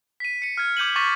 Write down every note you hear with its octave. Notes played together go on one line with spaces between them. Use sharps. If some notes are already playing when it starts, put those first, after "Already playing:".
B6 D#7
C#7 D#7
F6 G#6
D6 G6 D#7 F#7
C#6 D6 A6 B6 D#7